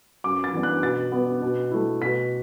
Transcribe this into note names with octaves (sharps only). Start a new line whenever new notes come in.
F#2 D6
A6
E3 B3 D4
F#6
B2 A6
B3 D4
B2
A3 E4
B2 B6